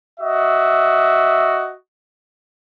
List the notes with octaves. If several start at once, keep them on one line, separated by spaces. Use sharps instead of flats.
F#4 D#5 E5